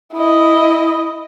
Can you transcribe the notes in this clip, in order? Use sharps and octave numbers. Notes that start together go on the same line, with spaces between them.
E4 D#5